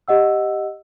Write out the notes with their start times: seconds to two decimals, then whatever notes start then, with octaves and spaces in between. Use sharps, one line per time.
0.08 G4 D#5 F#5 E6